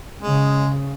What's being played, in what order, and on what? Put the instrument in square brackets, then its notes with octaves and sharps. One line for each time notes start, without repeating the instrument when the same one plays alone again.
[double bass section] C#3 [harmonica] G#3